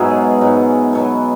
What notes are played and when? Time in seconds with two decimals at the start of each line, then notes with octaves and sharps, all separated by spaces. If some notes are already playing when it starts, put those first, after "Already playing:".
Already playing: G#2 B2 F#3 B3 C#4 E4 G#4
0.41 G#2 F#3
0.93 B2 F#3